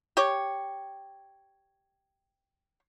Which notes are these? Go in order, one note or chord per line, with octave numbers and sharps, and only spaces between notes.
G4 C#5